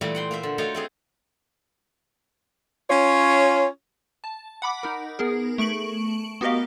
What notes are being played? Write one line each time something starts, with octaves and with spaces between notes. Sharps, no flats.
A#2 E3 G3 A3 A#3
F#5 G5 C6
A#3 C5 E5
D3
A3 D#4 F4 F#4 C#5 G5
A3 C4 G#4
C#4 F4 C#5
A5
F#5 B5 D6
D#4 A#4
B3 G#4 A#4
A3 C#6 D7 F#7
B3 F#4 G4 A#4 D#5 F5